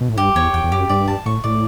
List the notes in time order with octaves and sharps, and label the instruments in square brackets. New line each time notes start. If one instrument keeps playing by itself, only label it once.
[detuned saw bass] B2
A2
[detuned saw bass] G2 [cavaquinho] G4
[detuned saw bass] E2 [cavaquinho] C#5
[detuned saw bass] E2 [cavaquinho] G5
[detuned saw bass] E2
[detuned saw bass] F#2 [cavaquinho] G4
[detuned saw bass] G2 [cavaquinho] D5
[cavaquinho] A5
[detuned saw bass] A2 [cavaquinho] C#6
[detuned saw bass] A2 [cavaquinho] D5